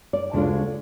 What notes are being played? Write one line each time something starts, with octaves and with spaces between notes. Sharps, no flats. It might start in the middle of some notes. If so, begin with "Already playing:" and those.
D5
D2 C#3 G#3 D4 F4